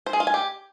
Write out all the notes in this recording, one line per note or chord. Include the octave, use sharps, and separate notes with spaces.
C5
G#4
F4
G#5
G4